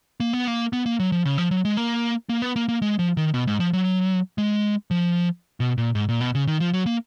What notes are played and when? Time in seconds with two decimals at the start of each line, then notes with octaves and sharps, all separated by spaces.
0.20 A#3
0.33 B3
0.47 A#3
0.73 B3
0.86 A#3
0.99 F#3
1.12 F3
1.25 C#3
1.38 F3
1.51 F#3
1.65 G#3
1.77 A#3
2.29 A#3
2.42 B3
2.56 A#3
2.69 A#3
2.82 G#3
2.99 F3
3.17 D#3
3.34 B2
3.47 G#2
3.60 F3
3.73 F#3
4.38 G#3
4.91 F3
5.60 B2
5.78 A#2
5.95 G#2
6.09 A#2
6.21 B2
6.35 C#3
6.47 D#3
6.60 F3
6.74 F#3
6.86 A#3